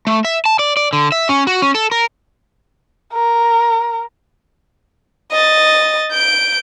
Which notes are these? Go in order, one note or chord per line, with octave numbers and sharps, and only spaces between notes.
A3
E5
A5
D5
D5
D3
E5
C#4
F#4
C#4
A4
A#4
A#4
D#5 A6
G6 D7